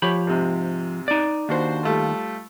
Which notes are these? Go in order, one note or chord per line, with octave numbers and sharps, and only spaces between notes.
F3 G4 C#5 B5
G#2 C3
D#4 D5
D#2 D4 F#4 C5
G3 A3 F4